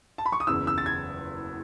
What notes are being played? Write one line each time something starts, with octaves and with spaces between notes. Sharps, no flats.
A5
B5
C#6
D#6
F#1 E2 C#3 E6
E6
A6
G#6